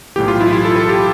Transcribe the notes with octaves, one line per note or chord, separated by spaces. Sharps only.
B1 A2 E3 G4
F4
E4
F4
A4
A4
G4